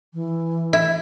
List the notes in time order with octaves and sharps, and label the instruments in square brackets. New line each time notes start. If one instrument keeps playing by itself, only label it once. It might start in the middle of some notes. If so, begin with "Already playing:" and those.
[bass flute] E3
[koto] E4